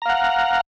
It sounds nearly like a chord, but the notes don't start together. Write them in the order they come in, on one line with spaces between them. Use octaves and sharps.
A#5 F5 F#5